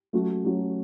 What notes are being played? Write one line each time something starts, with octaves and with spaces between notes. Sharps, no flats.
F#3 A3 C#4 F#4
F#3 A3 C#4 F#4